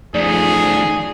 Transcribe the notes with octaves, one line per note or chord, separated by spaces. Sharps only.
D#3 F3 A3 G#4 D5